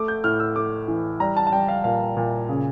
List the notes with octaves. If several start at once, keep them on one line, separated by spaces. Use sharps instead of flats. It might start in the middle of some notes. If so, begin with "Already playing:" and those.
Already playing: A3 D6
G6
A2 F6
E6
A3 D6
E3
G3 A#5
A5
A5
G3 G5
F5
A#2 F5
A#2
C#3